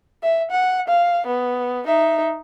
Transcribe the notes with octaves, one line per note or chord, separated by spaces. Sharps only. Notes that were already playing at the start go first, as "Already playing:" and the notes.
E5
F#5
F5
B3
D#4 E5